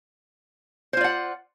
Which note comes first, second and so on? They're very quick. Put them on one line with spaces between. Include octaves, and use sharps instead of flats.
C5 F4 D5 F#5